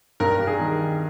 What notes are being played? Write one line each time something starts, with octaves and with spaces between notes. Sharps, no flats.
G2 A#4
G3
G#4
D#3
D#3